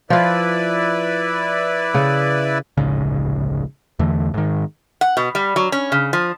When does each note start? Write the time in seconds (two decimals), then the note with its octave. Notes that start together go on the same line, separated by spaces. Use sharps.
0.10 F3 E4 F4 B4 D5
1.94 C#3
2.77 D1 A#1 G#2 C#3
3.99 E2 D3 E3 A3
4.34 G#2 D#3
5.01 F#5
5.17 B2
5.35 G3
5.56 F#3
5.72 C#4
5.92 C#3
6.13 F3